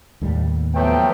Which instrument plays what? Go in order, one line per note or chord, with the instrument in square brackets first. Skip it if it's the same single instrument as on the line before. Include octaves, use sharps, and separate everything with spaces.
[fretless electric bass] D#2 A2 G3
[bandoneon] F3 F#3 A3 [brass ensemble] B3 B4 G5